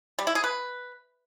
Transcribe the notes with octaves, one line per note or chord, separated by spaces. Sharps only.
G3
E4
G#4
B4